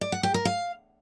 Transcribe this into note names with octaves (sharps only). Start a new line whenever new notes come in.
D5
F#5
G4
A#4
F5